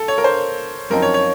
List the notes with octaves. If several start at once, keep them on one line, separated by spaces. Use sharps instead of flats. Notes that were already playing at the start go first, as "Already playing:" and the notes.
Already playing: A4
C#5
A#4
C5
F#2 F3 C4 D#4 A#4
C#5
C#5